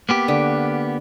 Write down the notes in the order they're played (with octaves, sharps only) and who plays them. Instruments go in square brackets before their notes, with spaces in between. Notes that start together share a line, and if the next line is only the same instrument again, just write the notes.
[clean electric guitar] A#3 B3 G4
[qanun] D3